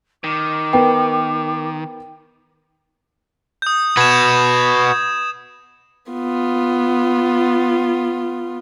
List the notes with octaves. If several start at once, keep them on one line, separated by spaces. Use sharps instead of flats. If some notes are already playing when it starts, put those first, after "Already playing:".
D#3 D6
B3 A#4 G5
D#6 G6
F#4 B4 G#6 E7
B3 F4